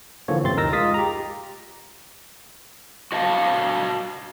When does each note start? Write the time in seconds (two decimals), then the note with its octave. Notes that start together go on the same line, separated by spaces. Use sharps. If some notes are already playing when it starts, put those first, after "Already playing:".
0.28 D3 E3 F3 A#3 C#5
0.42 B1 F#2 C3 C4 C6 A6
0.57 D2 D#4 A#4 E6 A#6
0.72 G#3 F4 F5 D#6 A6 B6
0.94 G4 A#5
3.12 F#4 D#5 F5 A5